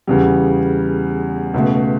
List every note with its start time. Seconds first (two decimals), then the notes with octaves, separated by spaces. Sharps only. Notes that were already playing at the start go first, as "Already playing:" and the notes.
0.07 E2 C#3 G3
1.54 C#2 B2 A3